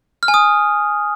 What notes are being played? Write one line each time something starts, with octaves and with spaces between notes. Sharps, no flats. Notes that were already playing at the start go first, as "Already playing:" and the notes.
F6
G#5
D#6